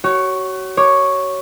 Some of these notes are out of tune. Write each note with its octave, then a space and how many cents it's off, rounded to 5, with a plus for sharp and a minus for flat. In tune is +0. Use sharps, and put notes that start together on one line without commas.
F#4 +35 C#5 +0
C#5 +0 D6 +5